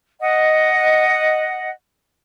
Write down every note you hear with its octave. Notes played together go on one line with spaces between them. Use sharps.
D#5 F#5